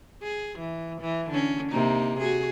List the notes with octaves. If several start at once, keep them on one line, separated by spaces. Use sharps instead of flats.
G#4
E3
E3
D3 C#4
C3 A#3 D#4
F#4 G#4